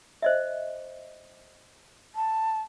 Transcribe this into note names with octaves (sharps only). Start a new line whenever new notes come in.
C5 D#5 E5
A5